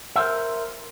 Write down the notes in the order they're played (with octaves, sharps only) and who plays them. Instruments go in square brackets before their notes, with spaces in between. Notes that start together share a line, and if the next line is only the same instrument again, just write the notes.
[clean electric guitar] A#4 C5 E5